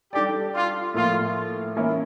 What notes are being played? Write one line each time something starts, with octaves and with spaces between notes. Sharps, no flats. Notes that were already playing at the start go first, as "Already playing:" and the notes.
G3 D4 G4 A4 D5
F4
A2 F3 A#3 F4
E3 A#3 C#4 E4 A#4